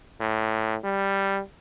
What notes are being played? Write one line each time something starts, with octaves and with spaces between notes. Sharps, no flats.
A2
G3